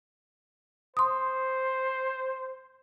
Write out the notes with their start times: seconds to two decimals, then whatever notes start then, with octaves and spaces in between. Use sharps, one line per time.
0.97 C5 C6 D#6